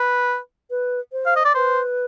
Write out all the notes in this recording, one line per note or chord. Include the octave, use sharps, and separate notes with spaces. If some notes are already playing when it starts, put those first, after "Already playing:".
Already playing: B4
B4
C5
F5
D#5
D5
B4 C5